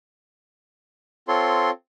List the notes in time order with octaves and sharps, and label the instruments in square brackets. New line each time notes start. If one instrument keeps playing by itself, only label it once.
[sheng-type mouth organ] C4 F4 A4 C#5 C6